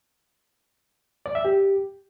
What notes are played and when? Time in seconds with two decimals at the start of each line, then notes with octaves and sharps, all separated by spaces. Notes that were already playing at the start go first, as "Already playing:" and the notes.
1.26 D5
1.35 E5
1.45 G4